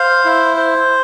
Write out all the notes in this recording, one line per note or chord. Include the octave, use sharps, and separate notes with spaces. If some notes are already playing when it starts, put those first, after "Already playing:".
Already playing: C5 F5
E4
C5